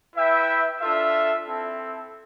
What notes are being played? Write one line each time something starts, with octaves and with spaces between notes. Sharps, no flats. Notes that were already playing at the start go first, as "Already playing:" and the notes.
E4 B4 E5 G5
D4 F4 A4 E5
C4 E4 A4